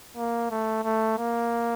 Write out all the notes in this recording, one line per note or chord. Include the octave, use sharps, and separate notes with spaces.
A#3
A3
A3
A#3